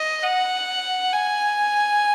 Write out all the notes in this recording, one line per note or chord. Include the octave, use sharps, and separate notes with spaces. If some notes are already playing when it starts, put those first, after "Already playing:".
Already playing: D#5
F#5
G#5